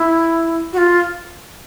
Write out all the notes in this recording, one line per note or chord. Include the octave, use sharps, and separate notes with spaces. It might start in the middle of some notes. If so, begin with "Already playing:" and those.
Already playing: E4
F#4
F4